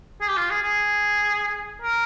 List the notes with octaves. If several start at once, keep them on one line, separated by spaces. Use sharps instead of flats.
G#4
G4
F4
G#4
G#4
A#4